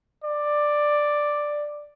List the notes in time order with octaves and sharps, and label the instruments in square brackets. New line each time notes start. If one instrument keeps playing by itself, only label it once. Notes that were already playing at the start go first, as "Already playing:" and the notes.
[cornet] D5